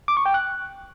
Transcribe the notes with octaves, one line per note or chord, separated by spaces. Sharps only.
D6
C#6
G5
F#6